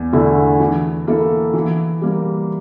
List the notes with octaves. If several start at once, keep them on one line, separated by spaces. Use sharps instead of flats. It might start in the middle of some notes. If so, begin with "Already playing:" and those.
Already playing: E2
D3 A3 E4
E3
A#3 E4 A4
E3
G3 A#3